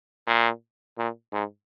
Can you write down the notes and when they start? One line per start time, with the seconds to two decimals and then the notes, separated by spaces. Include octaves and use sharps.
0.27 A#2
0.98 A#2
1.33 G#2